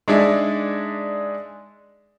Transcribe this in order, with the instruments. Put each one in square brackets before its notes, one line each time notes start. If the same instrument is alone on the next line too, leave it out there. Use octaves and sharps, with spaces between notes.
[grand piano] G#3 D4 D#4 G#4 D5 E5